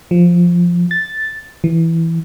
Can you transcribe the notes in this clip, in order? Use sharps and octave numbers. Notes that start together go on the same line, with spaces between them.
F3
A6
E3